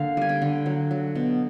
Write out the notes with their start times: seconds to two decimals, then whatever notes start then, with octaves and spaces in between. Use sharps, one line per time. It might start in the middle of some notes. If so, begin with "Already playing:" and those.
Already playing: D3 A#3 F5
0.17 G3 G#5
0.29 G5
0.42 D3
0.66 F#3
0.91 F#3
1.15 B2